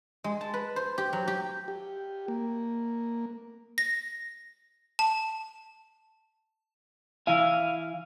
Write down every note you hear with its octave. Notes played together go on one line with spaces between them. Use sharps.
G#3
A5
B4
C5
G4
F#3
G4
G4
A#3
A#6
A5
E3 E4 F5 G#5